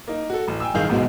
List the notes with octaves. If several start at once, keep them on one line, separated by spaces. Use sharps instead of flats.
A#3 D#4
F#4 A4
A1
G5 G#5 E6
D1 G1 D#3 G#4 F5 G6
A1 G#2 B2 F#3 G#3